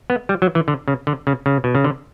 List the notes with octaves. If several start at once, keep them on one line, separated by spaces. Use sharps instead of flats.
B3
G3
F#3
E3
D3
C#3
D3
C#3
C#3
B2
C#3
D3